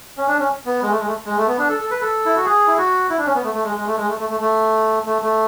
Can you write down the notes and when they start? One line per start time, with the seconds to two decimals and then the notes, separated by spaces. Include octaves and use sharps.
0.17 C#4
0.28 D4
0.39 C#4
0.66 B3
0.82 G#3
0.90 A3
0.99 G#3
1.07 A3
1.26 G#3
1.37 A3
1.47 B3
1.59 D4
1.69 A4
1.80 A4
1.91 B4
2.01 A4
2.26 E4
2.36 F#4
2.45 G#4
2.67 E4
2.78 F#4
3.10 E4
3.19 D4
3.26 C#4
3.35 B3
3.43 A3
3.54 A3
3.64 G#3
3.75 G#3
3.86 A3
3.97 G#3
4.08 A3
4.19 A3
4.29 A3
4.40 A3
5.06 A3
5.22 A3